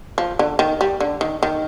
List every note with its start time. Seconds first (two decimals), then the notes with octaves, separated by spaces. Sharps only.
0.18 F3
0.39 D3
0.59 D#3
0.81 G3
1.00 D3
1.21 D#3
1.43 D#3